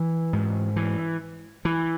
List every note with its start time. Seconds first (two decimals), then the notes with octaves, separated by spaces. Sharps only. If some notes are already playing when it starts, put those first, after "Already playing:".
Already playing: E3
0.33 G#2
0.76 E3
1.65 E3